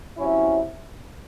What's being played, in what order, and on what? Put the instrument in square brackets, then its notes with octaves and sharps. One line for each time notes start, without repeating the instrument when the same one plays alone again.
[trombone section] C3 F#3 C#4 E4